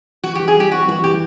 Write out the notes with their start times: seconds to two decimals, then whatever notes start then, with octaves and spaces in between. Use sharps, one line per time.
0.23 E3 F#4
0.35 G4
0.40 E3
0.48 G#4
0.55 G3 G4
0.72 C4 F#4
0.88 E3 F#4
1.04 E3 G4